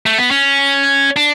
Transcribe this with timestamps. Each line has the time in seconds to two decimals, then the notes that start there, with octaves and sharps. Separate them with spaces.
0.06 A3
0.18 B3
0.31 C#4
1.16 D4